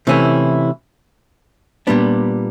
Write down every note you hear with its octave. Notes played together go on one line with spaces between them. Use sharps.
C3 E3 A3 C#4 E4
A#2 G3 B3 D4